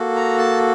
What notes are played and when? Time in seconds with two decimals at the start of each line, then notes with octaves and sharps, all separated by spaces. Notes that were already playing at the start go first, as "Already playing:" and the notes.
Already playing: A#3 F#4 A4
0.16 A#5
0.38 A5